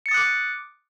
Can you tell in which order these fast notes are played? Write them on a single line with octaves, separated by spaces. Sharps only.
C#7 A6 D#6 F#6 D6